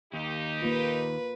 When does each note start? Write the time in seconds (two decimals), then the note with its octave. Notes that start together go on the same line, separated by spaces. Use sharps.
0.13 D#2 D#4 G4
0.62 A#3 F4 B4